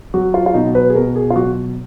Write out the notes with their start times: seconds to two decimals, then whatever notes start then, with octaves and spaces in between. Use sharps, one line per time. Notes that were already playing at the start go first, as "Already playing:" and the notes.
0.14 F#3 F#4
0.34 F4
0.46 F4
0.54 B2 D#4
0.75 B4
0.90 G#4
0.95 B2 A#4
1.16 G#4
1.30 F4
1.36 F#3 F#4